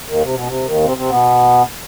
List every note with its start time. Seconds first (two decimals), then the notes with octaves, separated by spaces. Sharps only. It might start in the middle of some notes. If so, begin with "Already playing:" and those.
0.09 D#2 D#3
0.22 C3
0.34 B2
0.46 C3
0.66 D#2 D#3
0.84 C3 C4
0.97 C3 C4
1.10 B2 B3